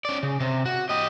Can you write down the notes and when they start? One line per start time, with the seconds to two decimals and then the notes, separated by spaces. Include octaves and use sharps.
0.05 C#4 D5
0.23 C#3
0.40 C3
0.66 F#4
0.89 G4 D#5